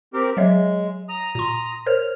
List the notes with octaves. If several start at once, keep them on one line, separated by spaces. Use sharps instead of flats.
C4 G4 A#4
F#3 G#3 C#5 E5
A#5 D#6
A#2 C6
A#4 C5 C#5 F6